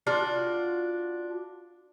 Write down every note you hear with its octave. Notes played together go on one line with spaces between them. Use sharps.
D4 F4 F#4